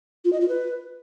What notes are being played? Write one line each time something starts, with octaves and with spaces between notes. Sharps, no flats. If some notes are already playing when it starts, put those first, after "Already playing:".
F4
D#5
F4
B4